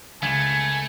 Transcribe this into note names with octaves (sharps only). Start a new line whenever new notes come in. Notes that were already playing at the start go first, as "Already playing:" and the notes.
C#2 A3 G#5